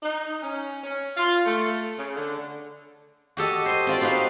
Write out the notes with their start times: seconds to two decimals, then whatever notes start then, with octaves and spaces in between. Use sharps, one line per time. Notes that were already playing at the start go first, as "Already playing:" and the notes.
0.02 D#4
0.42 C#4
0.84 C#4
1.17 F4
1.44 A3
1.97 C#3
2.16 D3
3.37 F#4 G4 A4 D#5
3.66 C5 D#5
3.87 C4 F4 D5
4.01 C4 D#4 F#4 B4 F5